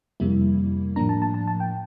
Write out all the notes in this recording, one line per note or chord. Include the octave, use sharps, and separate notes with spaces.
F2 C3 G3 A#3 E4
A2 F3 A#3 D4 A#5
A5
A5
A5
A5
G5